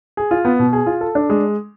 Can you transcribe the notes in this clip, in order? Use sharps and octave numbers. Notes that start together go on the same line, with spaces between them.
G#4
F4
B3
B2
G#4
F4
A4
D4
G#3